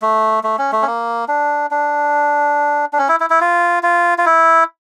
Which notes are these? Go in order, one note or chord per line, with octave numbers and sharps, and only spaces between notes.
A3
A3
C#4
A3
C#4
A#3
D4
D4
D4
C#4
E4
E4
E4
F4
F4
F4
E4